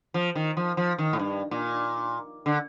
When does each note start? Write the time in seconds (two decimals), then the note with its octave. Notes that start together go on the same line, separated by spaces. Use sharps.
0.14 F3
0.35 D#3
0.57 F3
0.77 F3
0.98 D#3
1.13 A2
1.19 G2
1.51 A#2
2.46 D3